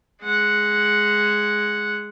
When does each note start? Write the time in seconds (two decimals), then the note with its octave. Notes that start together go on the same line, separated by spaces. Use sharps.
0.22 G#3 F#5